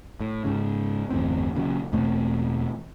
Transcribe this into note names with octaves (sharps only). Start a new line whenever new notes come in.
A2
G#2 C#3
G1 E2 A2 C4
A#2 C#3 E3 F#3
E1 B2 A3 C4